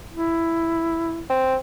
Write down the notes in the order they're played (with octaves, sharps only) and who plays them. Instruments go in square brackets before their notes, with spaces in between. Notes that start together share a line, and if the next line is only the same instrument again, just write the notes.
[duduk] E4
[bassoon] C4